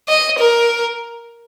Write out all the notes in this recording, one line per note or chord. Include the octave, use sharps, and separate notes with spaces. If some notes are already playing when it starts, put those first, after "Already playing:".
D#5
A#4